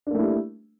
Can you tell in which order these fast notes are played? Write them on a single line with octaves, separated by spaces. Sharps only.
D4 A#3 A3 E4 G3